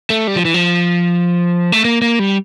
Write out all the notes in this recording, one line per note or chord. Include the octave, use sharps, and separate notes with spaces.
A3
G3
F3
E3
F3
A3
A#3
A#3
G3